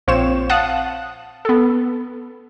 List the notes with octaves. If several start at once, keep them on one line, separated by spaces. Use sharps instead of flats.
A#1 C4 F4 C5 C#5 E7
F5 F#5 A5 D#6 F#6
B3 A4